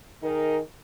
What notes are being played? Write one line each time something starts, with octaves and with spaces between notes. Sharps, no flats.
D#3 D#4 G#4 A#4